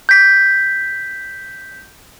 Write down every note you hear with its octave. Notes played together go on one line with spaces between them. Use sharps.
G6 B6